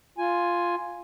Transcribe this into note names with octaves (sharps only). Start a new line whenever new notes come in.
F4 G#5